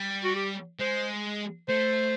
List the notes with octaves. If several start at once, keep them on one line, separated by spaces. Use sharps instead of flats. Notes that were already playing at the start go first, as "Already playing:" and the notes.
Already playing: G3
F#4
G4
G#3 C5
A3 C5